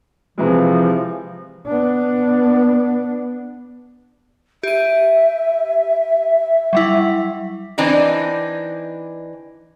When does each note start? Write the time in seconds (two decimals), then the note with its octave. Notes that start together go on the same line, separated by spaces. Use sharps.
0.38 C3 E3 F3 G#3
1.67 B3 D4
4.63 G4 E5 D#7
6.73 F#3 G3 E4
7.78 E3 C4 D4 D#4